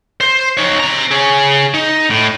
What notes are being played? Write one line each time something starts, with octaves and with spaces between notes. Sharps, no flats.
C5
D#4 C#5
C4 A#5
G#4 C#5
D#4
A2